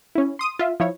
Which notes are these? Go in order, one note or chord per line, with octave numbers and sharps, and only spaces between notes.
C#4 E4
C6 D#6 D#7
F4 E5
F3 E4 C#5